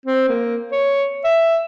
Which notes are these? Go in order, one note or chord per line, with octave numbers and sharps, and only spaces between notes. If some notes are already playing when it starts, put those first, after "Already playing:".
C4
A#3
C#5
E5